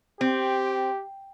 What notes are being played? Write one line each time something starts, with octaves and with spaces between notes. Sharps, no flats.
C4 G4